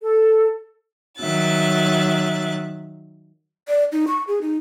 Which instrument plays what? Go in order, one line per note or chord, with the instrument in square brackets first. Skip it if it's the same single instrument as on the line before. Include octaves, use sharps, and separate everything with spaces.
[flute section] A4
[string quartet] D#3 F#3 E5 F#6 A6
[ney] D5
D#4
C#6
G#4
D#4